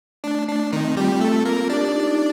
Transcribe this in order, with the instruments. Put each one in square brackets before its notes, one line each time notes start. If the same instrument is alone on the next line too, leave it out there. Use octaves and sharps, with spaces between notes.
[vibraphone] A3 [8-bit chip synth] D4
[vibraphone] A3 [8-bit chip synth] D4
[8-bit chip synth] D#3 D#4 [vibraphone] C4
[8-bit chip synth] G3 G4 [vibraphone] F4
[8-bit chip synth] A3 A4
A#3 A#4
[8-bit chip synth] D4 D5 [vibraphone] G4
[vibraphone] D#4
D#4